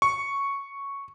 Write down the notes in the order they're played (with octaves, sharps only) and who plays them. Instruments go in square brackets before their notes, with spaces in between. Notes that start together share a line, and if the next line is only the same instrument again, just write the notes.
[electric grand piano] C#6